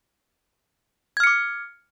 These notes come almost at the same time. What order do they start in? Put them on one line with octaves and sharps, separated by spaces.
G#6 F6 C#7 D6